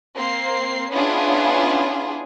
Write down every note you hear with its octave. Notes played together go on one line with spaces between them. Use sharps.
A#3 C4 C7
B3 C#4 D4 E4 F4 G#4